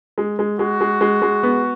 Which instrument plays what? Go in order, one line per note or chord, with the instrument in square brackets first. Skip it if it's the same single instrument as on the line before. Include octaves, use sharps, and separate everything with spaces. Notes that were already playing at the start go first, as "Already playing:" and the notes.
[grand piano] G#3
G#3
[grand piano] G#3 [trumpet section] F#4
[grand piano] G#3
G#3
G#3
B3